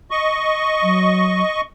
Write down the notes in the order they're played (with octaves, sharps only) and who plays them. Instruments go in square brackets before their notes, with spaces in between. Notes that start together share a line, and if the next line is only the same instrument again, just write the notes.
[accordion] D#5 C#6
[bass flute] F#3